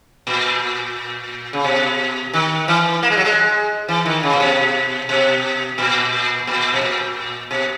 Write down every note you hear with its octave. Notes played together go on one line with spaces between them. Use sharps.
A#2
C#3
B2
D#3
E3
A#3
G#3
F#3
G#3
E3
D#3
C#3
A#2
B2
B2
A#2
A#2
B2
A#2
B2